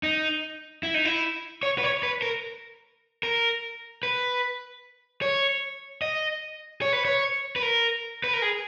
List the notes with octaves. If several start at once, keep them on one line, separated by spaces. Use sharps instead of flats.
D#4
E4
D#4
E4
C#5
B4
C#5
B4
A#4
A#4
B4
C#5
D#5
C#5
B4
C#5
B4
A#4
B4
A#4
G#4